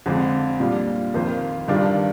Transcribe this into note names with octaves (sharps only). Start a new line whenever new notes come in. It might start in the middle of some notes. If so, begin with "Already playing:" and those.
F2 D3 G#3 C4 F4
A#2 G3 D4 F4
F2 D#3 A#3 F4 C5
G2 D#3 G3 D4 F4